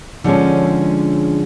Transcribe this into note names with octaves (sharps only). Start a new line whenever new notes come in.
D3 F3 G#3 C#4